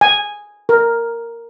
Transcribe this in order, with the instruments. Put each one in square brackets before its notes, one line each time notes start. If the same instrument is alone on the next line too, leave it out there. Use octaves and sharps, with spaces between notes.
[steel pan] G#5
A#4